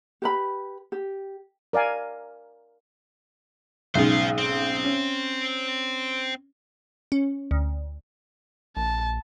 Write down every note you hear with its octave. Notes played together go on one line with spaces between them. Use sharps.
G4 B4 B5
G4
A#4 D5 F5 G#5
B1 G#2 C#3 C5 F5
C4
C#4
C#4
D2
A#1 A5